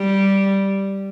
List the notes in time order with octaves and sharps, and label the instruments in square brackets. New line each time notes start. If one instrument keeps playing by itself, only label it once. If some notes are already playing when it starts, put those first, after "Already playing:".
Already playing: [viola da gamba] G3